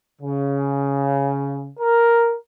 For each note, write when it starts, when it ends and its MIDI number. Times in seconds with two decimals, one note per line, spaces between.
0.21 1.70 49
1.79 2.36 70